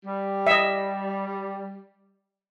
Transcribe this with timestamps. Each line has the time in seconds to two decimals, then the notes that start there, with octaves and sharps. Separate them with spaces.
0.05 G3
0.47 D#5 E5